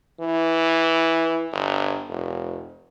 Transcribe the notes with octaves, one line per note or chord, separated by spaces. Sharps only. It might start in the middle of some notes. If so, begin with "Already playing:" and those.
E3
G1
F1